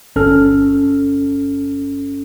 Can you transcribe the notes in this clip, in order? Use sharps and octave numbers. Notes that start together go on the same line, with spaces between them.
G1 C#4 A4 F6